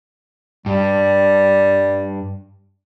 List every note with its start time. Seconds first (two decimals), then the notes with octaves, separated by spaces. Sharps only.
0.66 G2 G3